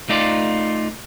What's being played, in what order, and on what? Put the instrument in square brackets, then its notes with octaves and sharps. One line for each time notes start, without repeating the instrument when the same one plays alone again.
[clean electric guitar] A3 D#4 F4 D5